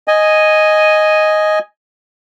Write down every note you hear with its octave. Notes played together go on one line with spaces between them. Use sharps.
D#5 G#5